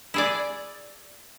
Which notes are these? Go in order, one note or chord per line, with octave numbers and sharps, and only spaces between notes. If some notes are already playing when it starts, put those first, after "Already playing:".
E4 G#4 D5